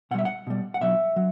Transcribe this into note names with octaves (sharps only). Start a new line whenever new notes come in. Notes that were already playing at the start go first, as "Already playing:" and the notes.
B2 G3 E5 F#5
F#5
B2 G3
F#5
B2 F#3 E5
F#3